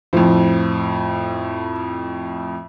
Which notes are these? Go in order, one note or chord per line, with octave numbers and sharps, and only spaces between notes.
F2 A2 F3